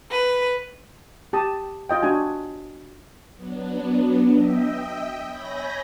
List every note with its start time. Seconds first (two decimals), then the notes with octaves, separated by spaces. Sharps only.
0.11 B4
1.33 G4 A5 D#6
1.89 F4 D#5 G5
2.02 D4 F#4 G#5
3.35 F#3 B3 D4
4.32 D#5 E5 G5
5.26 C#5 G#5 B5 G6 A#6